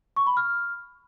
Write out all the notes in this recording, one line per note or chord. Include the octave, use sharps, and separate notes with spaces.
C#6
B5
F6